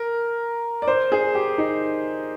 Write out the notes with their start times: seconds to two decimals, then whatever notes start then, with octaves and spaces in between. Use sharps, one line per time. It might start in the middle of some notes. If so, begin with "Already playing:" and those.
Already playing: A#4
0.82 D5
0.87 C5
1.12 G#4
1.35 G4
1.58 D#4